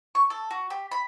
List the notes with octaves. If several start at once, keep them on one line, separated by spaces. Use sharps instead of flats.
C#6
A4
F#4
G4
B5